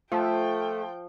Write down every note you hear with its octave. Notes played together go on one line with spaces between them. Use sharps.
F3 A3 F4 G5